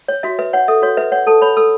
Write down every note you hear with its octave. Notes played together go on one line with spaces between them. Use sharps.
C#5
F#4 E5
B4 E5
C#5 F#5
A4 E5
F#4 C#5
B4 E5
C#5 F#5
A4 A5
C#5 B5
A4 E6